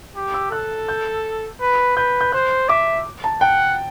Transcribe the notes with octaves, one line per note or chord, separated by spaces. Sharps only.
G4
E6
A4 F#6
G6
B4
B4 G6
G6
C5 F#6
E5 D6
A5
F#5 G5